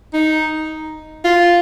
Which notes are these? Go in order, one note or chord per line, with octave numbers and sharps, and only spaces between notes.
D#4
F4